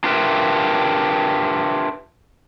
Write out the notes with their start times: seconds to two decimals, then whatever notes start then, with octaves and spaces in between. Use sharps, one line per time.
0.04 D4 F4 G4 A#4 B4 E5